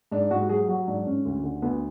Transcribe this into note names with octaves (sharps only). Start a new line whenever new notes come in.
G#2 D4
G#2 F#4
F#3 G#4
F#3 F#4
G#2 D4
G#2 C#4
D2
D3
D2 B3